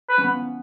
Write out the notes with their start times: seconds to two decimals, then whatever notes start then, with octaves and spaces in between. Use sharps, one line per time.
0.09 B4
0.18 C#4
0.24 B3